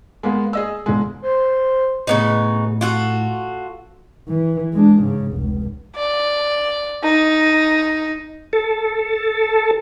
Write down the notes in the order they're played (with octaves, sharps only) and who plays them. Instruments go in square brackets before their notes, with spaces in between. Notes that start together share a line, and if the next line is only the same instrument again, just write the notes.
[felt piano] G#3 A#3 B3
G#4 D#5 E6
E1 G#3
[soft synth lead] C5
[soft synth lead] A2 [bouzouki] C#3 B3 D#4
[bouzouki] F4 F#4 A4
[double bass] E3
G#3 D4
G#2 C#3
F1 C#2
[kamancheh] D5
D#4
[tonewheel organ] A4